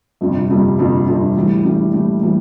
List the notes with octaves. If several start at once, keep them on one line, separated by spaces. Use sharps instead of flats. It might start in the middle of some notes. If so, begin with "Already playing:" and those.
G1 F2 C3 G3
G1 F2 C3 G3
G1 F2 C3 G3
G1 F2 C3 G3
A2 E3 G3
A2 E3 G3
A2 E3 G3
A2 E3 G3